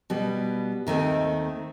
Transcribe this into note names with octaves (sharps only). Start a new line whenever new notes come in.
B2 G3 B3
D#2 D#3 A3 C4